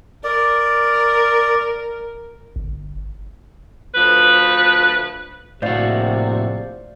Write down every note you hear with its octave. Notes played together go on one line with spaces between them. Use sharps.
A#4 D5
G1
D2 F3 B4
A#1 A2 C3 F#4 C5 D5 F5